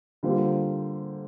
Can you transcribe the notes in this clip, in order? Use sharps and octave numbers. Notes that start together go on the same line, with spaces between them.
D3 G3 A#3 F4 C5